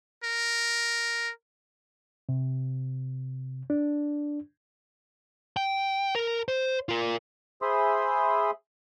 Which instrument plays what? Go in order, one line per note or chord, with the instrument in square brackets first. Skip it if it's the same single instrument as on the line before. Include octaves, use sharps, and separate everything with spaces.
[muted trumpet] A#4
[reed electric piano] C3
D4
[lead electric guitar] G5
A#4
C5
F4 A#4
[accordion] G#4 C5 E5 B5 C6 D#6